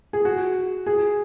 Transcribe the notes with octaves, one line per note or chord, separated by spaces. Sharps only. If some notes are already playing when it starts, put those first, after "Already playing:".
G#4
F#4
G#4